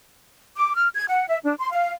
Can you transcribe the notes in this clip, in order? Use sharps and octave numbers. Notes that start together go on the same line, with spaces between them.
D6
F6
G#6
F#5
E5
D4
C6
F5